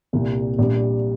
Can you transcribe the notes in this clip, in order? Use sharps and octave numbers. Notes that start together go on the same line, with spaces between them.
C2 A#2 G3
A#1 A#2 G3